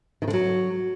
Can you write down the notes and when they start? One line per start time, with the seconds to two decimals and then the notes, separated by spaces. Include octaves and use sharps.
0.22 D#3
0.28 D3
0.33 F#3